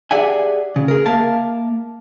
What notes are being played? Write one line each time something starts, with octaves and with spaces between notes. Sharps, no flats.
G4 G#4 D5 E5 F#5 G#5
C#3
G#4 A#4
A#3 A#4 E5 F5 A5